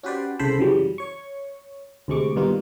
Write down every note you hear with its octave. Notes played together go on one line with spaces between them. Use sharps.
C#4 F#4 G4 B4 C5 D5
C2 C#3 A4 C5 B5 E6
F#2 C#3 E3 F#3 G3
C#5 C#6
D2 C3 G#3 C#6 D6
G2 B2 D#3 G3 A#3 F4